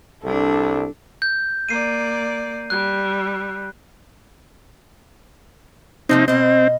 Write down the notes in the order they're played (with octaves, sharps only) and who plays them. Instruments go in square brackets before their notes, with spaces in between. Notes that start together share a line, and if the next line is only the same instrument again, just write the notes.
[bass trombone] C2 [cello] G3 D4 [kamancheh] A4
[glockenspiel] G6
[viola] A#3 D5 [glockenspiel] C7 D#7
[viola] G3 [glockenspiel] F#6
[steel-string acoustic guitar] C3 F3 A#3 [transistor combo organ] C4 D#4
[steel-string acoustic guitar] B2 D#5 [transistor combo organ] C4